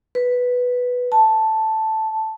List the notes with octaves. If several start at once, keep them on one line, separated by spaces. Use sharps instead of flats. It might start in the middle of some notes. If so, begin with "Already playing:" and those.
B4
A5